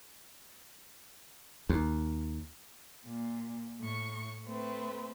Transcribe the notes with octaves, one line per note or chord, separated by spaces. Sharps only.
D#2
A#2
A2 C#6
A3 C4 B4